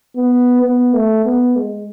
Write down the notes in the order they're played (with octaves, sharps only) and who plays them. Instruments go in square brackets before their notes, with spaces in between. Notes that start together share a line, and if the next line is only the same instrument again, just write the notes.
[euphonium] B3
B3
A3
B3
G#3